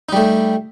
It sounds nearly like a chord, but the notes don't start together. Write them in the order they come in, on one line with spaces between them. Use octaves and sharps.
D#4 G3 A3